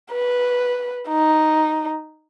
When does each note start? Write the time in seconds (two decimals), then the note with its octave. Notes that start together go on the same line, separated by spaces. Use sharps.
0.12 B4
1.09 D#4